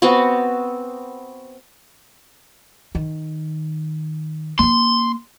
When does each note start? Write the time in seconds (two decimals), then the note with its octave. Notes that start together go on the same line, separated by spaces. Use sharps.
0.02 B3 C4 F#4
2.95 D#3
4.59 A#3 C#4 C6